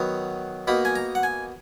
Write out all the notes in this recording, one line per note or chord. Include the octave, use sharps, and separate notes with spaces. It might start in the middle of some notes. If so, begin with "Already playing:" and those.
Already playing: D#3 F#3 B3
B2 A#3 D#4 B5
G#5
A#5
F#5
G#5